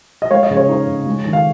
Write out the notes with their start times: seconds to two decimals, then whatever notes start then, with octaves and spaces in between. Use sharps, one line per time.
0.22 D#5
0.31 G#3 C#5 F5
0.43 D#5
0.51 C#3
0.57 C#5
0.69 D#4 C#5
0.87 C#3
1.06 G#3
1.25 D#3
1.33 F5